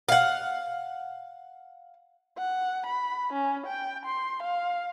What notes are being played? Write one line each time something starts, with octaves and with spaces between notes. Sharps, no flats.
F5 F#5
F#5
B5
C#4
G5
C6
F5